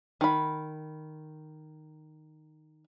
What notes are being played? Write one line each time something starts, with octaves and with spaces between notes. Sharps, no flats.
D#3 B5